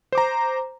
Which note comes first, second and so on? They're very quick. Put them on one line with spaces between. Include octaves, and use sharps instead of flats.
C5 D6 A#5